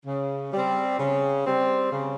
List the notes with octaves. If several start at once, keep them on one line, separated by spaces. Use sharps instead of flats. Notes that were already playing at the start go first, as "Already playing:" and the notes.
C#3
G3 C4
C#3
G3 C4
C#3